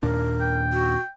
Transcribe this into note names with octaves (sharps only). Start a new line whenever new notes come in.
D#2 A#2 D4 A#4
G5
F#4